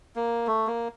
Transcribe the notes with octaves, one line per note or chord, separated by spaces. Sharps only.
A#3
A3
A#3